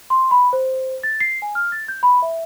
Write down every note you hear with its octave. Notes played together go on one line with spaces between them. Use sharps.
C6
B5
C5
A6
C7
G#5
F6
A6
G6
B5
E5